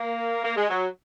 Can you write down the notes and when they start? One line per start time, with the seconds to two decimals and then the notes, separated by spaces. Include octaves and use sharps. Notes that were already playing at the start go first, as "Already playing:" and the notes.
Already playing: A#3
0.44 A#3
0.56 G#3
0.69 F#3